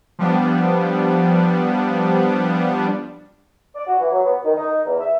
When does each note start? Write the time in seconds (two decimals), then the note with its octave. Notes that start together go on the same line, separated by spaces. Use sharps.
0.19 F3 G3 B3 D4
3.74 D5
3.86 F#4
3.99 E3
4.12 F#3
4.25 B3
4.44 D#3
4.56 D#4
4.86 E2
5.00 E5